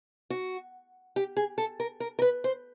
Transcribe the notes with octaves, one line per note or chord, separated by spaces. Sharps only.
F#4
G4
G#4
A4
A#4
A#4
A#4
B4
C5